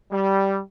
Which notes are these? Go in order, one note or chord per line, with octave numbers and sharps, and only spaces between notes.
G3